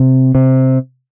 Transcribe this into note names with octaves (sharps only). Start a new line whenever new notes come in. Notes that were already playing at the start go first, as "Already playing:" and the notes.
Already playing: C3
C3